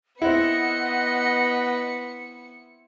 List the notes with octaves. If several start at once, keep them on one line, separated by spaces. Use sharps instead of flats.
B3 C4 E4 D#5 F#5 C#7